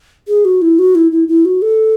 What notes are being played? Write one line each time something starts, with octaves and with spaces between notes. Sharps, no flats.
G#4
F#4
E4
F#4
E4
E4
E4
F#4
A4